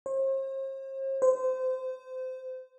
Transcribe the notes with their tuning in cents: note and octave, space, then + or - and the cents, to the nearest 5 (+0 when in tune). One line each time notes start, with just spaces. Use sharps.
C5 +45
C5 -25